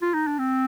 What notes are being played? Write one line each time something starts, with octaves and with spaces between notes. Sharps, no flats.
F4
D#4
D4
C4